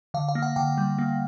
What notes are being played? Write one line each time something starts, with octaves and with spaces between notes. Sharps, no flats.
D3 F5
F5
A#3
F#5
D3 G5
G3
A#3